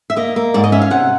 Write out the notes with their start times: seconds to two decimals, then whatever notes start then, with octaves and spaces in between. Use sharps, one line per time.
0.10 E5
0.16 A#3 D#5
0.36 A#3
0.54 G#2 D5
0.64 D#5
0.72 C#4 E5
0.82 F5
0.91 C3 F#5